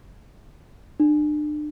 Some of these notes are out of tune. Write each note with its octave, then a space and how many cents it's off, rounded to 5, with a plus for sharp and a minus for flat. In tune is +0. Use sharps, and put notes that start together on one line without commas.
D4 +35